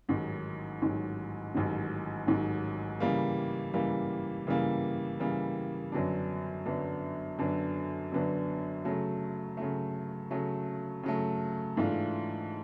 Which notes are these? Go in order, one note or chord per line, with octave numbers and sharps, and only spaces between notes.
A1 G#2 D#3 F#3
A1 G#2 D#3 F#3
A1 G#2 D#3 F#3
A1 G#2 D#3 F#3
C#3 E3 G3 A#3
C#3 E3 G3 A#3
C#3 E3 G3 A#3
C#3 E3 G3 A#3
F#2 D3 F#3 B3 D4
F#2 D3 F#3 B3 D4
F#2 D3 F#3 B3 D4
F#2 D3 F#3 B3 D4
C#3 F#3 A3
C#3 F#3 A3
C#3 F#3 A3
C#3 F#3 A3
G#2 E3 A3 D4 F4